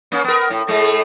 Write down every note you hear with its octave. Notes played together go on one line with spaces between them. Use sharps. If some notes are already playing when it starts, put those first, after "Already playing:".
A#3 C#4
B3 A#4
A2
A2 G#3 A3